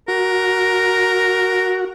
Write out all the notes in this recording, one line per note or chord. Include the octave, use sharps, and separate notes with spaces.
F#4 A#4